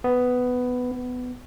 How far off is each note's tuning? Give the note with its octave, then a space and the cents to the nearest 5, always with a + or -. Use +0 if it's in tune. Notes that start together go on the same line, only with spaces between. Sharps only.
B3 +10
B3 +15